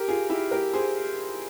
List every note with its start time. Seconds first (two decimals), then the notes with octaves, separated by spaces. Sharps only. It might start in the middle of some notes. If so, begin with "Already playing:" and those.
Already playing: G4 A#4
0.08 F4 G#4
0.30 E4 G4
0.51 G4 A#4
0.74 G#4 C5